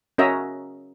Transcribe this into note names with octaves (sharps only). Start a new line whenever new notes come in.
C#4 F#4 A#4 D#5 E5 A#5